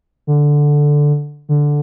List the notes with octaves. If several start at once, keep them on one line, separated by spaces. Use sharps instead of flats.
D3
D3